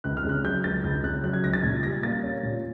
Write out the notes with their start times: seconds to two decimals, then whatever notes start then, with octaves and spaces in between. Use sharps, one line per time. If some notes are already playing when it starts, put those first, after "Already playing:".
0.04 C#2 F#6
0.17 F6
0.25 C#3 F#6
0.44 F#3 G6
0.64 C#2 A6
0.84 C#2 G6
1.03 C#3 F#6
1.23 F#3 F#6
1.33 G#6
1.44 C#2 A#6
1.53 A6
1.63 A#2 G#6
1.83 G3 A#6
2.03 A#3 A6
2.23 C#4
2.43 A#2